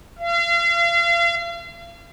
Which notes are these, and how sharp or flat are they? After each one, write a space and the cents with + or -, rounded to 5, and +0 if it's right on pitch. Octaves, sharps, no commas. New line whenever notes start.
F5 -40